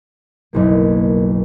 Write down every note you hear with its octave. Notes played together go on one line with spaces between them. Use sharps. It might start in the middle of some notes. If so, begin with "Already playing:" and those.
F#1 B1 A#3